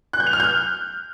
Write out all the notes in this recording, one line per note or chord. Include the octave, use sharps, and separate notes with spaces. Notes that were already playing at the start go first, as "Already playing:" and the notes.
F#6
G6
F7
F6
G6